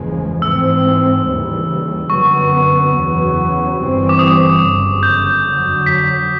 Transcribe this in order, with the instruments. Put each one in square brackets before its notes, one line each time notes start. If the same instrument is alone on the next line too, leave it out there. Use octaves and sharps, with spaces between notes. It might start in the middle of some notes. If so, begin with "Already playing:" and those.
Already playing: [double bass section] F#1 E2 C#3 F3 G#3
[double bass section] G#2 E3 A3 C4 [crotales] E6
[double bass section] D#2 C#3 E3 G3
[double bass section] F#2 D3 F#3 B3 [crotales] C#6
[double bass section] E2 C#3 F#3 B3
G1 G2 E3 G3 C4
[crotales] D6
D#6
[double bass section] G1 F#2 C#3
[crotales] G6
[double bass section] F2 D3 F#3
[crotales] B6